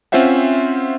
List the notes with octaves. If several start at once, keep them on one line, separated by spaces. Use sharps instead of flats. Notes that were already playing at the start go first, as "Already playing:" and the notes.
C4 C#4 F4 C5 E5 F#5